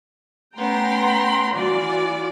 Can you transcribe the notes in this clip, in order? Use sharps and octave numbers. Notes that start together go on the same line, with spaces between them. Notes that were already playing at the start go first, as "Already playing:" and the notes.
A3 B3 C#4 G5 A#5 C6
E3 F4 F#4 D5 G#5